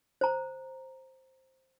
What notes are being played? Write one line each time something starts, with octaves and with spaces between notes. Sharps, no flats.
C5 A#5